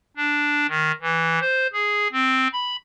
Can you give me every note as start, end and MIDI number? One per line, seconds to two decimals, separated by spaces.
0.16 0.67 62
0.69 0.92 51
1.01 1.39 52
1.41 1.67 72
1.73 2.08 68
2.12 2.48 60
2.53 2.76 83